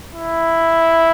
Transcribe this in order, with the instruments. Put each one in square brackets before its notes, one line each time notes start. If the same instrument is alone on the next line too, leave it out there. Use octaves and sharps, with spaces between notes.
[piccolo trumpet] E4